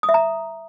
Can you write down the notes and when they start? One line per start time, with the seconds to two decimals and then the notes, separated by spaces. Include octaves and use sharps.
0.03 D#6
0.09 E5
0.14 A#5